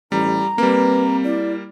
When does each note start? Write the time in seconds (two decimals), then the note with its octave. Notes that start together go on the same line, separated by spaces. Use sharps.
0.12 A1 G3 A#5
0.58 G3 A#3 C4 B4
1.24 E4 D5